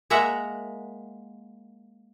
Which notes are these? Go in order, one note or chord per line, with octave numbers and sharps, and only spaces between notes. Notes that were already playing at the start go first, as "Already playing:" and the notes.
G#3 A#3 E5 F#5 A#5